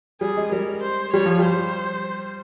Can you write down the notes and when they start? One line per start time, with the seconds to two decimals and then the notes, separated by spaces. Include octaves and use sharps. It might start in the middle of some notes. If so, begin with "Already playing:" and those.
0.21 G3 G#4
0.37 G#3
0.52 G3 A#4
0.83 C5
1.13 G3 C#5
1.26 F3
1.39 G3
1.44 C5